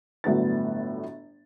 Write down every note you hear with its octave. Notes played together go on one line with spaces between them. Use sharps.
G1 A2 F#3 B3 D4 A6